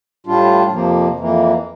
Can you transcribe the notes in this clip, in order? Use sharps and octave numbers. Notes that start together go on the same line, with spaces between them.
A2 G3 D4 F4
F2 C3 F3 A#3
F2 E3 A#3